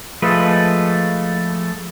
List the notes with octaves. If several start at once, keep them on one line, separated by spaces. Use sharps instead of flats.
F3 G#3 A3 B4